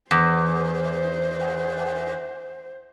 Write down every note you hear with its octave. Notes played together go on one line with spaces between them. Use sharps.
E2 C5